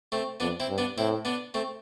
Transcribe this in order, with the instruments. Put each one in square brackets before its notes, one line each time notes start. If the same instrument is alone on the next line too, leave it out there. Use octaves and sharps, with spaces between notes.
[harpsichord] A3 C4
[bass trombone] F2 [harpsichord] B3 D4
[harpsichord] C4 E4
[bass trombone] G2
[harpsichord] B3 D4
[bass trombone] A2 [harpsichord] C4 E4
[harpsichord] B3 D4
A3 C4